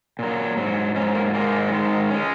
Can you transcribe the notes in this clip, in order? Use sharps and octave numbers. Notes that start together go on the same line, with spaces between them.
A#2 F#3
G#2 F#3
G#2 F#3 C#4
A#3
G#2 D#3 G#3 A#3
G#2 D#3 G#3
G#3 C#4